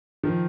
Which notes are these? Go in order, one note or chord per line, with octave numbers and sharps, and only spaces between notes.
D#3 F3